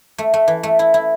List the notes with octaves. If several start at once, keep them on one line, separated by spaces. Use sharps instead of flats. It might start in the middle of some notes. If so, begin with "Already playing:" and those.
A3
A3
E3
A3
E4
E4